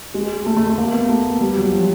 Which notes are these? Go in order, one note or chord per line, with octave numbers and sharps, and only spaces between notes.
G#3
A3
A3
A3
A#3
B3
A3
G3
F#3
F3